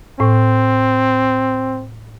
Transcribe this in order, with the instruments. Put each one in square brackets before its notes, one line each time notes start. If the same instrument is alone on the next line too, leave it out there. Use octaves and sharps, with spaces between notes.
[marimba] A2 [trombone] C4